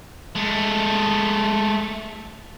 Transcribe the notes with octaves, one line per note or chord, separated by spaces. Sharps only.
G#3 A3